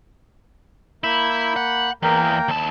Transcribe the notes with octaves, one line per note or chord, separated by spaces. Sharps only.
A#3 E4 B5 G6
F#5
E2 A#3 A#4 G5
D#2 A5